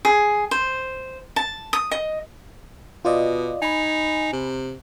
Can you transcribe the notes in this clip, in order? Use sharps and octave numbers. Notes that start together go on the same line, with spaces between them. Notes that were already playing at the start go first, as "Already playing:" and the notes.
G#4
C5
A5
D#6
D#5
B2 F4 D5 D#5
D#4 G#5 B5
C3